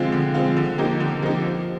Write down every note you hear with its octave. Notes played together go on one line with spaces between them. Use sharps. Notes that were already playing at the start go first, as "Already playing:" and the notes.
Already playing: D3 F3 G#3 C4 F4
D3
F3 G#3 C4 F4
D3
F3 A#3 D#4 G4
D3
F3 A#3 D#4 G4
F3